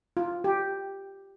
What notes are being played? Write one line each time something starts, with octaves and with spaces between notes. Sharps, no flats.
F4
G4